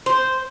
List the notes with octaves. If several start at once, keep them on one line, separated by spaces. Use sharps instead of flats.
C5